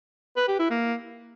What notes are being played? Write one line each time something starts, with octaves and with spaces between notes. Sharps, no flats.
B4
G4
E4
A#3